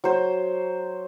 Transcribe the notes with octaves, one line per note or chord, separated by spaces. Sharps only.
F#3 C5